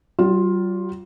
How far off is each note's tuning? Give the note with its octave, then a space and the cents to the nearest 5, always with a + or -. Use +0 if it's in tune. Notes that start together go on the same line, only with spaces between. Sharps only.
G3 -45 F4 +10